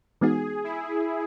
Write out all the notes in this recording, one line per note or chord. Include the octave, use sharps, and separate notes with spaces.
E3 G#3 B3 D#4 F#4 G#4
E4